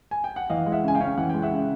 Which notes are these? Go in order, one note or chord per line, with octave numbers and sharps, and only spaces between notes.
G#5
G5
F#5
E3 D#5 F5
G#3
E5 F#5
C#3 G#5
F5 G5
C#4
E3 F#5
G#3 G5
E5 F#5
C#3